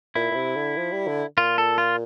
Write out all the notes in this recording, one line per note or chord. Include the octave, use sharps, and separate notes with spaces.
A#2 E4
A#2
C3
D3
F3
G3
D3
A#2 F4
A4
F4